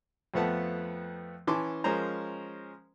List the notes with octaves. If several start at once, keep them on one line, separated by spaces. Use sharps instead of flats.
F2 F3 A3 B3 F#5 A5
E3 C#4 A5 C6 D6
F3 G#3 C#4 A#4 C5 A#5